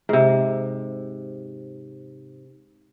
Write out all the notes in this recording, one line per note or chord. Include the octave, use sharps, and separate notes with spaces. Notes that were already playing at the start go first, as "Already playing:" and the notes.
G#2 C3